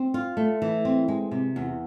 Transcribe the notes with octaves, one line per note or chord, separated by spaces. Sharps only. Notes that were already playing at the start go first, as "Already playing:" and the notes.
Already playing: C4
F4
A3
E3
C4
G#3
C3
E2